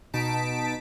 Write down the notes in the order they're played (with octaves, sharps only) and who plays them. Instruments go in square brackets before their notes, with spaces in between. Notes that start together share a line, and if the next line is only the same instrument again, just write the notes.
[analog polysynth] B2 D#4 A5 B6 D7